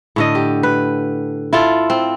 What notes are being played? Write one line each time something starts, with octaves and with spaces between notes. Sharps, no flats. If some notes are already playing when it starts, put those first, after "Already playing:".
A2 D3 D#5
G4
B4
E4 F4 A4
C4